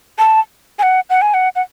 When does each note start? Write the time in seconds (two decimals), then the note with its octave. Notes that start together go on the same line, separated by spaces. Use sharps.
0.18 A5
0.79 G#5
0.83 F#5
1.10 F#5
1.22 G#5
1.34 F#5
1.56 F#5